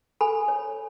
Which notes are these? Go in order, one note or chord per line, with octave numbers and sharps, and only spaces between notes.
A4 G#5 B5
C#5